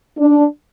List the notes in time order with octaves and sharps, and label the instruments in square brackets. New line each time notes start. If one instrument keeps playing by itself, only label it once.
[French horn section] D4